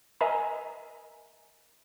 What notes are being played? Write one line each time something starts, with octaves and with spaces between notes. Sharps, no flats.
A#4 D#5 E5 G#5 A#5